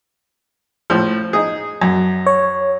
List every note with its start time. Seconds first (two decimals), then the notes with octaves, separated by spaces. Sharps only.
0.90 A2 F3
1.33 D#4 G#4
1.82 F#2
2.26 C#5